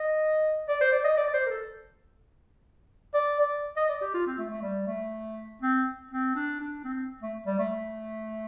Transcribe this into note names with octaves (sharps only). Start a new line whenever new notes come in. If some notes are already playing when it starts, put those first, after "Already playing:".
Already playing: D#5
D5
C5
D5
D#5
D5
D5
C5
A#4
A4
D5
D5
D#5
D5
G4
F4
C4
A3
A3
G3
A3
C4
C4
D4
D4
C4
A3
G3
A3